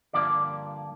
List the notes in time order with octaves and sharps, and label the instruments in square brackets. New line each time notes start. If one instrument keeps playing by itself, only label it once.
[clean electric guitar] G2 D3 F3 A#3 D5